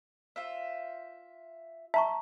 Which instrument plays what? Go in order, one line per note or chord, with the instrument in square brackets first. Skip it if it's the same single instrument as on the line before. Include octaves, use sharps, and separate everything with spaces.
[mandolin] F4 C5 E5
[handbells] E5 [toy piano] A5 A#5 C#6